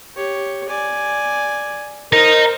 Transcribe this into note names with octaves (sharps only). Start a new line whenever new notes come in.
G4 C#5
D5 G#5
A#4 C5 D#5 A#5